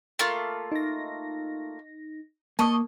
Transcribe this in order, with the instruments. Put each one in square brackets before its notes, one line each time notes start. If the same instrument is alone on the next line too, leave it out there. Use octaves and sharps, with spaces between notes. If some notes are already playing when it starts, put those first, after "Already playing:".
[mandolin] A3 A#3 F4
[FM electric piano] D#4 A#6
[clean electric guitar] A#3 [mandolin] D#5 [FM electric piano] A5 C#6 D#6